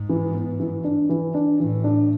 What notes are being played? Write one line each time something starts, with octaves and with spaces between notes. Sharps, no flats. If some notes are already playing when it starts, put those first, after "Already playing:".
Already playing: G#2
E3
B3
E3
D4
E3
D4
A2 E3
D4